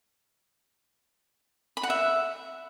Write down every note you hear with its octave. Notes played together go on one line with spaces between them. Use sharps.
B5
F#5
E5